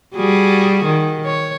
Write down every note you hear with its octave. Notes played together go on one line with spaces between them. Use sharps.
G3 F#4 G#4
D#3
C#5